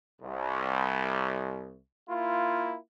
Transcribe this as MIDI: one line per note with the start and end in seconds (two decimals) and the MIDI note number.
0.22 1.77 36
2.09 2.77 58
2.09 2.77 64
2.09 2.77 65